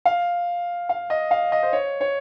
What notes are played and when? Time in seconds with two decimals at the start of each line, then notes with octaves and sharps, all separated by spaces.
0.06 F5
0.89 F5
1.10 D#5
1.31 F5
1.52 D#5
1.63 C5
1.73 C#5
2.01 C#5